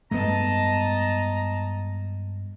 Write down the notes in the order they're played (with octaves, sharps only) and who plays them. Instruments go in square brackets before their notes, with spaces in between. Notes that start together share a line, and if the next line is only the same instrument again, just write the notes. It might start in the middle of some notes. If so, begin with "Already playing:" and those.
[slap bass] G2 G#3 [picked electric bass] A3 B3 [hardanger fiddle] D#5 A5 [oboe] A#5